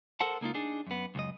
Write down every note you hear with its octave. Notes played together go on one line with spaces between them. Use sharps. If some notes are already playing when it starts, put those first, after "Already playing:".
A4 A#4 C5 F#5 A5
C#2 A#3 D#4 F4
D4 D#4 G#4
F#2 B3
C#2 F#2 D#5